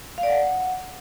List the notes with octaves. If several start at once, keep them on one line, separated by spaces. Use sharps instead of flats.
F5
D5
F#5